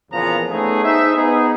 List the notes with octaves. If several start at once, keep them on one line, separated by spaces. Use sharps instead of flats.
E2 A#2 C#3 F3 B3 A#5
A3 B3 C#4 D#4 G#4
D#4 G#4 C5 D#5 E5
B3 D#4 G#4